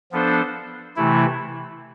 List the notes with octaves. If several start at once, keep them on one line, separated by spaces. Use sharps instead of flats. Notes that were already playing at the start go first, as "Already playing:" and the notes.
F3 B3 D4 A4 C5
C3 E3 A3 E4